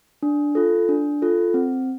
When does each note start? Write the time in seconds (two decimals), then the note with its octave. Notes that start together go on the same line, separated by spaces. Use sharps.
0.23 D4
0.55 F4 A4
0.89 D4
1.22 F4 A4
1.54 C4